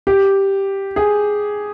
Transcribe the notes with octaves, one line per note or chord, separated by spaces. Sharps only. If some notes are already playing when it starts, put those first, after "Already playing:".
G4
G#4